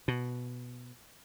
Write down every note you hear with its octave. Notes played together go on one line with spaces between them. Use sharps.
B2